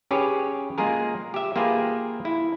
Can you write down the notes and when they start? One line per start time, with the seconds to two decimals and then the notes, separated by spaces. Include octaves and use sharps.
0.11 C#4 G4 G#4 B4 C#5
0.78 G#3 A#3 F4 G#4 A#4
1.34 G4 E5
1.56 A#3 F4 G4 G#4 B4
2.25 E4